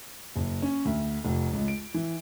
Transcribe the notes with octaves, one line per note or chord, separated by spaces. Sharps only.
F#1
C#4
D2
F1
C#2
D7
E3